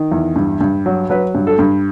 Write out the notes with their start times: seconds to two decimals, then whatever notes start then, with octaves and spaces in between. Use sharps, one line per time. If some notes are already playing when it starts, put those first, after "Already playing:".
Already playing: D#3
0.12 E2
0.36 G2
0.61 G2
0.86 F#3
1.10 F#3 B4
1.35 G2
1.47 A4
1.59 G2